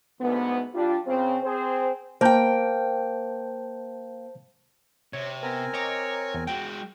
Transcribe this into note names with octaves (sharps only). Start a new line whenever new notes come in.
D2 G#2 B3
G3 D4 F4
C#3 C4
C4 G#4 C5
A#3 C5 G5 A5 G6
C3 C#5
B3 C4 A#4 G#5
C#5 D#5 A#5 D6
E2
G#3 F#4 G5